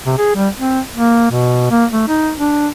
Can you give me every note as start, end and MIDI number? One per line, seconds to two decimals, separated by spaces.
0.06 0.17 48
0.18 0.34 68
0.35 0.48 55
0.57 0.80 60
0.93 1.30 58
1.31 1.68 47
1.71 1.85 58
1.92 2.05 57
2.08 2.32 63
2.37 2.68 62